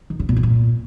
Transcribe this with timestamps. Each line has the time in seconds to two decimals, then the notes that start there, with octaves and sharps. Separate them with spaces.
0.10 D#3
0.19 C#3
0.29 A#2
0.36 B2
0.43 A#2